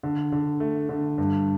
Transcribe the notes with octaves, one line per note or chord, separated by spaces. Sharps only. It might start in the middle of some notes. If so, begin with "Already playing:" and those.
D3
D3
A3
D3
G2